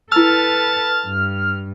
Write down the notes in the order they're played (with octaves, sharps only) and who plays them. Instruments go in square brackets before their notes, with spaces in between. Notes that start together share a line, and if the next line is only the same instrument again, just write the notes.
[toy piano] E4 E6 [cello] A4 B4 [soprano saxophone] A5 [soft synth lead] F6
[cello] G2